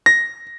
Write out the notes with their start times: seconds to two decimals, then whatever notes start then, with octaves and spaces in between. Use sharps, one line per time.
0.06 A#6